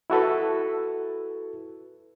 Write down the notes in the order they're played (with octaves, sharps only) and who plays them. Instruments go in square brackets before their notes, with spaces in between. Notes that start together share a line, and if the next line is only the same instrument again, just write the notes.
[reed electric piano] E4 F#4 A4 B4